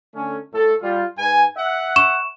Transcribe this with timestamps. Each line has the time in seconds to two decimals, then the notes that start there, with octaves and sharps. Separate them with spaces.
0.14 D3 A3 C#4
0.53 A2 A3 A4
0.82 G3 F4
1.17 G#2 B4 G#5
1.57 E5 F#5
1.96 C#6 E7